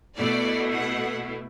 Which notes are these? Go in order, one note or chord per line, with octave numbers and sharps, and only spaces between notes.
B2 A3 E4 D5
F#5